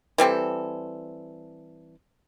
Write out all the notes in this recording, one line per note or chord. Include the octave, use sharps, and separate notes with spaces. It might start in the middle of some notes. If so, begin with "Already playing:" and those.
E3 G3 C4 A4